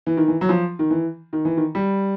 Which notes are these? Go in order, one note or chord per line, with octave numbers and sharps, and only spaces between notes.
E3
D#3
E3
F#3
F3
D#3
E3
D#3
E3
D#3
G3